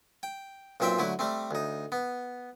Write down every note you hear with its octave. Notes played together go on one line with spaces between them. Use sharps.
G5
B1 A#2 C4 C5 E5 G5
D3 F#3 A3 E4
G3 A3 C4
D2 D#4
B3